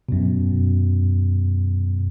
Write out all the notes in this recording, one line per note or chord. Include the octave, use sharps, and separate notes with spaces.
F#2 B2